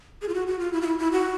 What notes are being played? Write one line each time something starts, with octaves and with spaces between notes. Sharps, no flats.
G#4
F4
F#4
F#4
F4
E4
F4
E4
E4
F#4